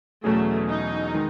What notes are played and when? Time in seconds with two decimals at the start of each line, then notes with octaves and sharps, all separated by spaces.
0.24 E2 B2 F#3 A3 C#4 G#4
0.69 D#4
1.14 D#3 G#3